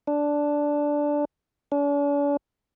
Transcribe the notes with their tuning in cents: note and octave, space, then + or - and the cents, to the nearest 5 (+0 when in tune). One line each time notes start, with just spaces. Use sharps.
D4 -5
D4 -45